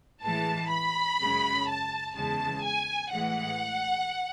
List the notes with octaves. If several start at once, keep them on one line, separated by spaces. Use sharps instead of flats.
A2 E3 G#3 A5
B5
F#2 C#3 G#3
A5
E2 C#3 E3 G#3 A5
G#5
A2 E3 G#3 F#5